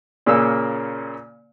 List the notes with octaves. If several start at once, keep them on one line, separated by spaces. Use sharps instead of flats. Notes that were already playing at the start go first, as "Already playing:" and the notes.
A#2 C#3 A#3 C#4 E6